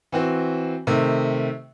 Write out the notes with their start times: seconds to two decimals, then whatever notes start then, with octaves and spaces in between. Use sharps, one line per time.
0.12 E3 C4 F#4
0.87 C3 D#3 A3